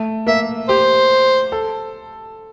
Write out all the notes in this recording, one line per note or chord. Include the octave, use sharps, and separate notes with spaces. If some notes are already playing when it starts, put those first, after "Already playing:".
Already playing: A3
A#3 E5
G4 C5
A4